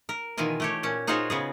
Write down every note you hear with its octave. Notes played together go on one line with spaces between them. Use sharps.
A#4
B2 D#3 E3 F4 G#5
A3 G4 C#5
A#2 C#4
D#4 F4 F#4 G#4 C5 C#5
C#3 B3 G#4